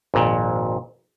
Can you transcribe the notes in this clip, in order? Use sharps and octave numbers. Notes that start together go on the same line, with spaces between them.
G#1 F2 A#2